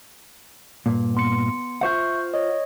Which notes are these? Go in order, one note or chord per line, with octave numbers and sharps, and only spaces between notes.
G2 A#2
B3 C6 C#7
F4 C5 E5 F#5 C#6 G6
C#5 D#5